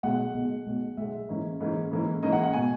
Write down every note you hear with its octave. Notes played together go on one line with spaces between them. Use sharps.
B1 B2 G#3 F#5
B1 B2 G#3
B1 B2 G#3
B1 B2 G#3 E5
G#2 E3 A#3 C#4
G#2 E3 A#3 C#4
G#2 E3 A#3 C#4
G#2 E3 A#3 C#4 D#5
F#5
F#5
B2 G#5